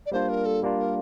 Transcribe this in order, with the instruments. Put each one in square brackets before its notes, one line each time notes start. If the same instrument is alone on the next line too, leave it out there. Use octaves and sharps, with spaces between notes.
[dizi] D5
[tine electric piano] G3 A#3 D4 F4 [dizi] C5
[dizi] A#4
A4
[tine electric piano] G3 A#3 D4 F4
[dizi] A#4